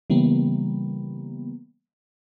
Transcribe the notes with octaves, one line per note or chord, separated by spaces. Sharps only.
C#3 E3 G3 A#3 B3